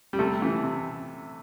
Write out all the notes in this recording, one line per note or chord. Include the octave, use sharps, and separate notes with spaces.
G3
C3 A3
E3
C3